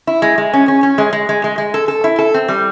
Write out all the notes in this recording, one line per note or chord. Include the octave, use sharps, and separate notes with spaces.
E4
G#3
G#3
C#4
C#4
C#4
G#3
G#3
G#3
G#3
G#3
A4
A4
E4
A4
C4
G3